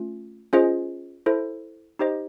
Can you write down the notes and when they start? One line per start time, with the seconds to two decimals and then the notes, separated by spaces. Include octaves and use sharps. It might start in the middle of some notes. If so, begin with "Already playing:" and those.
Already playing: A3 C#4 F4
0.53 C#4 F4 G#4 C5 D#5
1.26 E4 A4 C5
1.99 D#4 G4 C5 D#5